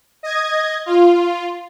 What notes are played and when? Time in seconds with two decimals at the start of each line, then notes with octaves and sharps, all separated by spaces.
0.23 D#5 G#6
0.86 F4